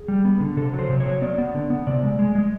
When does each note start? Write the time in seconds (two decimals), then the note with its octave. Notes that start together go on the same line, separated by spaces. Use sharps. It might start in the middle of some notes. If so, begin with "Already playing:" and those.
Already playing: G#4
0.08 G3
0.25 B3
0.40 D3
0.57 C3 A4
0.73 F#3
0.79 C5
0.89 C3
1.00 C#5
1.06 F#3
1.22 B3 D5
1.38 B3
1.54 D3
1.70 B3
1.87 C3 D5
2.03 G#3
2.19 G#3
2.35 G#3